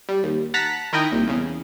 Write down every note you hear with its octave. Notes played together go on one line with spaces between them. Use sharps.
G3
D#2
F#5 A5 A#5 B6
D#3 E4 A#4 D#5 G5
C2 A#2
E2 C#3